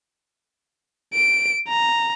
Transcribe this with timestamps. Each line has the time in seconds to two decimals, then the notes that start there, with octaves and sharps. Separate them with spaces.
1.14 D7
1.69 A#5